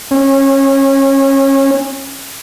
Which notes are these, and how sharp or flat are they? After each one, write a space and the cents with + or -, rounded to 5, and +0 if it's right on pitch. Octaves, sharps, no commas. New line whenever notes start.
C#4 -25